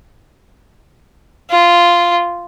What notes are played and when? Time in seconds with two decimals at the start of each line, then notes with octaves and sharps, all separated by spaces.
1.50 F4